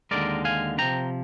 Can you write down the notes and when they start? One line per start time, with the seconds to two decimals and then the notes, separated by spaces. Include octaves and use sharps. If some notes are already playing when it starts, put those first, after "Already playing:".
0.11 D#2 D3 G#3 A#4 D5
0.45 F5 G#5
0.78 C3 F3 A#3 D4 G5 A#5